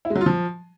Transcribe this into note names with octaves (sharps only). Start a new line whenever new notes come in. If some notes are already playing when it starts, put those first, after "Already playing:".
E4
G#3
F#3
F4
F3